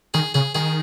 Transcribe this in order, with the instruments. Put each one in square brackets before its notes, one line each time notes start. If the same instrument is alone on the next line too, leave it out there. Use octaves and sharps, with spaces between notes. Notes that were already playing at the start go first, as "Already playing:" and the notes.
[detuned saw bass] D#3 [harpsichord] G#4
[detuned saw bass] C#3 [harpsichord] G#4
[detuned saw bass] D#3 [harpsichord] G#4